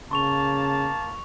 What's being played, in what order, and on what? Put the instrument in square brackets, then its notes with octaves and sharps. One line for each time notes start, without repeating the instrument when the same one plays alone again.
[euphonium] C#3 [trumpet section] A#3 A5 [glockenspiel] C6 C#6 F7